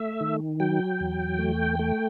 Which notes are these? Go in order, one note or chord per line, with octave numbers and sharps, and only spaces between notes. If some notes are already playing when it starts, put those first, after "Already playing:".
Already playing: A3 E5
D#3
F#3 G5
E2
A3
A3